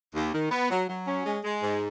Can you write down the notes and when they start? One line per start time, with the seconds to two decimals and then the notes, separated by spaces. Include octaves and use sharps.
0.15 D#2
0.33 D#3
0.51 B3
0.70 F#3
0.88 F#3
1.07 C#4
1.25 G#3
1.44 G#3
1.62 G#2